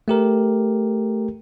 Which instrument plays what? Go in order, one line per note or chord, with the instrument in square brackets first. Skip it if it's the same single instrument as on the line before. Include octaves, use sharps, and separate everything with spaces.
[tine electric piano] A3 G4 A#4